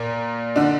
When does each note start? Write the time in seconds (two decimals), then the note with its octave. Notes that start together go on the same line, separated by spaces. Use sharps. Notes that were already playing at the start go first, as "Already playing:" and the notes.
Already playing: A#2 A#3
0.56 D3 D4